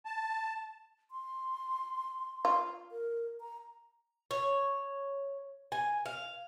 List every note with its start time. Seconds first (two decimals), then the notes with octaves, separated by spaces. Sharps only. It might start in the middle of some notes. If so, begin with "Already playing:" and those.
0.05 A5
1.11 C6
2.45 F4
2.91 A#4
3.41 A#5
4.31 C#5
5.72 G#5
6.06 F5